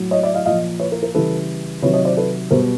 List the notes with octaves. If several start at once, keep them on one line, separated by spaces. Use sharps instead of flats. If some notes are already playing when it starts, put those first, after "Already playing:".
Already playing: A2 F#3
C#5 D#5
D5 E5
D#5 F5
A#2 F3 D#5 F5
B4 C#5
A#4
A#4
C#3 E3 G3 A4 B4
C3 D#3 F#3 B4 C#5
C#5 D#5
C5 D5
A4 B4
B2 G3 A#4 C5